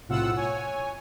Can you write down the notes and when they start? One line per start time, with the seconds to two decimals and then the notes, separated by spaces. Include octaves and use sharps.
0.08 B1 A2 C3 F4 F#5 E6
0.36 C#5 G#5